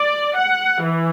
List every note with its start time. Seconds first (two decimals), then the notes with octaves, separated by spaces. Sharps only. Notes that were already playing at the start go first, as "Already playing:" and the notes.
Already playing: D5
0.37 F#5
0.82 E3